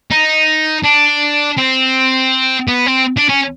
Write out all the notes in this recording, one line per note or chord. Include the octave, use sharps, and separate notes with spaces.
D#4
D4
C4
B3
C4
D4
C#4